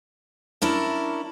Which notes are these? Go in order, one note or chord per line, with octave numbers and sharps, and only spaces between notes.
C#4 D4 E4 A#4